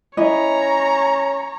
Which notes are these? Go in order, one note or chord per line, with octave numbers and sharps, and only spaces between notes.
C#4 E4 C#5 D#5 A#5